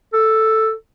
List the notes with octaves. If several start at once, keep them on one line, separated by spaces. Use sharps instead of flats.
A4